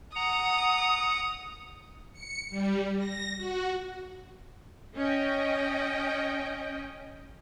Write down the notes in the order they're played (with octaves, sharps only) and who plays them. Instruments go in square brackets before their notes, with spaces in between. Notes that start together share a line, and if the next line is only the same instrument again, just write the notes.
[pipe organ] F#5 A#5 [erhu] D#6
[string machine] C#7
G3
A#6
F#4
[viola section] C#4 D#5 G5